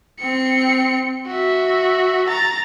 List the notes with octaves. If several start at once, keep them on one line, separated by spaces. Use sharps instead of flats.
C4 C#7
F#4 E5
A#5 A6